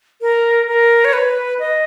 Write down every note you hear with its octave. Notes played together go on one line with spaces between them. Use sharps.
A#4
A#4
C#5
B4
D#5